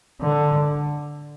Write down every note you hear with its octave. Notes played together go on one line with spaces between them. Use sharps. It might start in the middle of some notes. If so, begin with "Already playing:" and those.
D3